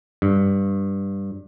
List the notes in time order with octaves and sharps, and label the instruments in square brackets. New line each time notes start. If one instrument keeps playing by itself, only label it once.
[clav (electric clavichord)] G2